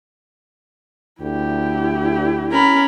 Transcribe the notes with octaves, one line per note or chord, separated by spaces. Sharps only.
D2 E4 G4
C#4 A#4 B5